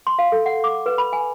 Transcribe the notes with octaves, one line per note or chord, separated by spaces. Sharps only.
C6
F5
A4
F#5
D6
B4
B5
G#5